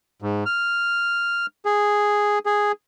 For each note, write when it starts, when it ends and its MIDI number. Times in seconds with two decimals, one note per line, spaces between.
0.22 0.44 44
0.46 1.46 89
1.65 2.39 68
2.46 2.72 68